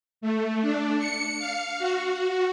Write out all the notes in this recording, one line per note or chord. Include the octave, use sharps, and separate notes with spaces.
A3
D4
C#7
F5
F#4
F#4